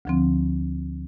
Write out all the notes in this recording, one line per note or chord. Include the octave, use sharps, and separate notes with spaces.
D2 D3 F3 C4